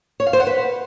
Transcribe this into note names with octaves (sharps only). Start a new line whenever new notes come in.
C#5
F5
C5
F#5
B4